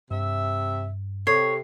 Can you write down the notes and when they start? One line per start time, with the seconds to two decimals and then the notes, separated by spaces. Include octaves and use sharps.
0.11 G2 C3 E5
1.27 C3 A4 C#5 C7